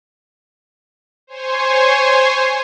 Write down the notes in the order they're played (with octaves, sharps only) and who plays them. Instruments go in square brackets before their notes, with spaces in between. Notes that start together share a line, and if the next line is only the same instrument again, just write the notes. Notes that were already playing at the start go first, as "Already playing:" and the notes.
[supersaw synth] C5 C#5 G#5 C6 C#6